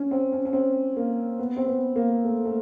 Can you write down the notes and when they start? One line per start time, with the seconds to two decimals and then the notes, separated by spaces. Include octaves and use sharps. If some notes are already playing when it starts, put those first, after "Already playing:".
Already playing: C#4
0.11 C4
0.32 C#4
0.45 C#4
0.53 C4
0.97 A#3
1.39 B3
1.57 C4
1.67 B3
1.96 A#3
2.24 A3
2.45 A3